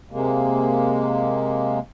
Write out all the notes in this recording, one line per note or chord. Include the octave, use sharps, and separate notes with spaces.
C3 G#3 A#3